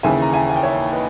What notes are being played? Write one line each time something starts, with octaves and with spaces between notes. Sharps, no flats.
D#2 C#3 E3 E5 G#5
A#5
E5 G#5
G#5
G5
C#5 E5
B4 D#5